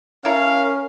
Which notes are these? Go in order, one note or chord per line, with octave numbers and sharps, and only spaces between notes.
C#4 E4 A4 A#4 F5 A#5